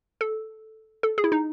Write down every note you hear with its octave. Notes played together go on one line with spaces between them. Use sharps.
A4
A4
G#4
E4
D#4